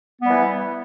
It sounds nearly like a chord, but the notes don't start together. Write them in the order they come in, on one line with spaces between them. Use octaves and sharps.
B3 G3 E3